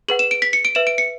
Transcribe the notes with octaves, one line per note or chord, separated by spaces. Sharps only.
G#4 B4 F#5 F#7
E7
D7
B6
C#7
D7
B4 E5 E7
D7
C#7